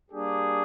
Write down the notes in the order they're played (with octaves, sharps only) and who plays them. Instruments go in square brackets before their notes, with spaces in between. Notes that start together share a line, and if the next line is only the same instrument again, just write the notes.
[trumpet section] G3 A#3 D4 G4 G#4